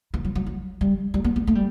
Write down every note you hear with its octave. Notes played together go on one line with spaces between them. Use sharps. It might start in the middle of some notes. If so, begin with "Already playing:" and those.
E3
F#3
F#3
F#3
G3
G3
B3
B3
A3
G3